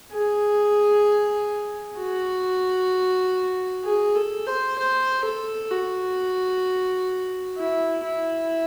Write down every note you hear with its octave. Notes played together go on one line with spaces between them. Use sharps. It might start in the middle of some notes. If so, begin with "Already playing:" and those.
G#4
F#4
G#4
A4
C5
C5
A4
F#4
E4
E4